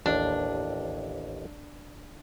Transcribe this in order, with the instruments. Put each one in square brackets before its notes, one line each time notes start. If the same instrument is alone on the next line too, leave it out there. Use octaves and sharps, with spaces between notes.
[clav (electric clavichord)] A1 D#2 [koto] D4